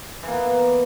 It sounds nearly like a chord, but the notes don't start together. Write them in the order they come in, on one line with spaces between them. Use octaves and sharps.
E3 A#3 B3